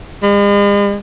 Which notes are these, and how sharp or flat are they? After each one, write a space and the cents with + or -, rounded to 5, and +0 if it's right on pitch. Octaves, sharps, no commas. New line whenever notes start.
G#3 -45